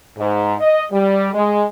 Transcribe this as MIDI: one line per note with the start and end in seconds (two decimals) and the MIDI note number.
0.17 0.55 44
0.60 0.84 75
0.91 1.31 55
1.34 1.63 56